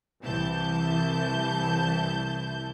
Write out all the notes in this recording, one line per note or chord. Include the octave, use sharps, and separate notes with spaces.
C2 E3 A5 G6